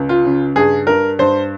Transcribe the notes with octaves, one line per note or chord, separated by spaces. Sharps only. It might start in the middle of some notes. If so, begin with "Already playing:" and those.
Already playing: C#2
F4
C#3
G2 G#4
G2 A#4
G2 C5